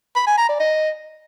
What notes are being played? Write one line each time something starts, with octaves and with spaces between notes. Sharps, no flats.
B5
G#5
A#5
D5
D#5